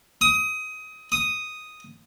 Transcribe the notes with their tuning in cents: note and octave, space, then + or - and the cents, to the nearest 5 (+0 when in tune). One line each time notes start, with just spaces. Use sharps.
D#6 +20
D#6 +0